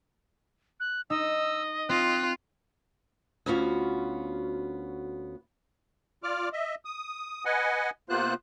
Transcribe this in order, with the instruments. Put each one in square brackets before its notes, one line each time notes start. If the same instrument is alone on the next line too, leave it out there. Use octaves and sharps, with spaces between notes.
[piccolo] F#6
[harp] D#4 [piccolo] D#5 [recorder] E6
[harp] C4 [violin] F4 [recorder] F#6
[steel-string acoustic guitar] D2 B3 C#4 F4 F#4
[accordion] F4 D5 D6 F6
D#5 E5
D#6
B4 D#5 F#5 G#5
C3 A#3 B3 F4 C5 F#6